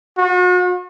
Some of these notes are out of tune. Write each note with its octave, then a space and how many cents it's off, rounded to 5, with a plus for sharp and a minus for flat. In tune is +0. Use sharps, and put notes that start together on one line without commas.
F#4 -40